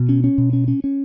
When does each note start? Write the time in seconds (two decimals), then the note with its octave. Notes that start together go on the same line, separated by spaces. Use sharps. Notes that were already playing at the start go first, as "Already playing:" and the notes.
Already playing: B2
0.09 C#4
0.24 C#4
0.38 B2
0.53 C#4
0.68 C#4
0.84 C#4